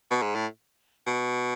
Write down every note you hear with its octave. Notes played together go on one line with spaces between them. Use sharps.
B2
G#2
A2
B2